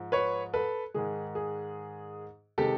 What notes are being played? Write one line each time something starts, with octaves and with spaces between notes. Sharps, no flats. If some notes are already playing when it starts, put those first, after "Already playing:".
Already playing: G#2 F3
B4 C#5
A4 B4
G#2 D#3 G#3 G#4
G#4
C3 D#3 G#3 G4 A4